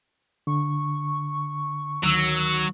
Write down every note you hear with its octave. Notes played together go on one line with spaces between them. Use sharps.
D3 C#6
D2 D#3 F#3 E6